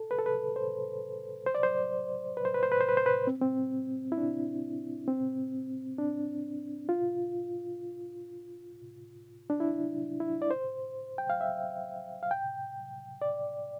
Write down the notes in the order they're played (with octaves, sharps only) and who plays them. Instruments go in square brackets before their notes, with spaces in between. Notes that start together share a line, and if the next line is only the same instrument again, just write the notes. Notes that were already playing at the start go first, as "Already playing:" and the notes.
Already playing: [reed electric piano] A4
B4
A4
B4
C5
C5
D5
C5
B4
C5
B4
C5
B4
C5
B4
C5
B4
C4
C4
E4
D4
C4
D4
F4
D4
E4
E4
D5
C5
G5
F5
E5
F5
G5
D5